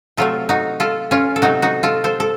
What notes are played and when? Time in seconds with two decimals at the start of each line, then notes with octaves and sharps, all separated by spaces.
0.17 C3 F#3 A3 F4 A4
0.49 D#4 F#4
0.80 F4 A4
1.11 C#4 F4
1.36 A4
1.42 C3 F#3 A3 D#4 F#4
1.62 D#4 F#4
1.83 F4 A4
2.04 A4 C5
2.20 A4